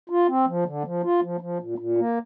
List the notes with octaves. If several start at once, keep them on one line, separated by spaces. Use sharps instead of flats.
F4
C4
F3
D3
F3
F4
F3
F3
A#2
A#2
A#3